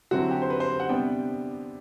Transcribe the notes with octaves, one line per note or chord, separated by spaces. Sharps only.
D3 F#3 C4 E4 F#4
G4
C5
B4
C5
F#5
C3 G3 B3 D4 G5